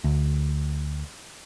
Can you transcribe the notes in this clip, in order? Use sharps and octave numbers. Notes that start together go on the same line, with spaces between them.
D2